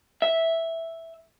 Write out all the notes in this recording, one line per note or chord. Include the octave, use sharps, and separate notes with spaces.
E5